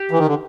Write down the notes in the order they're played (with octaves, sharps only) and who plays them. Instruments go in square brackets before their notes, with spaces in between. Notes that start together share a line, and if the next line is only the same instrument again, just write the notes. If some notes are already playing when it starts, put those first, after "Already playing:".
Already playing: [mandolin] G4
[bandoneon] E3
D#3
D3